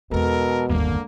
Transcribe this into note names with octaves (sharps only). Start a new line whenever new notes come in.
E2 B2 G#3 A4 A#4
D1 G1 D#2 D3 A#3